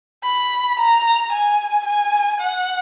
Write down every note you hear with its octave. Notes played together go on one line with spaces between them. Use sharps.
B5
A#5
G#5
G#5
F#5